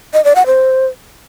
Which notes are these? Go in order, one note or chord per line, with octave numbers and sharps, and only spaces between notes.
D#5
D5
F#5
C5